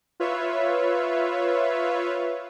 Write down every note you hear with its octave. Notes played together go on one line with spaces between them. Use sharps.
F4 B4 C#5 E5